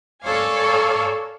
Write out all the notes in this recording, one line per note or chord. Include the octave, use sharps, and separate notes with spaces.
A4 A#4 C#5 D5 F5 G#5